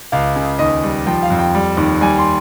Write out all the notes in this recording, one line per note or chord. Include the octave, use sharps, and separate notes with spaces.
C#2 F5
C#3
D#2 D#5
G3
F3 G5
F5
F2
G5
G3
D#2
G3 G#5
C6